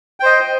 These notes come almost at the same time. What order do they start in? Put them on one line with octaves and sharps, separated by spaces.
G5 C5 D#5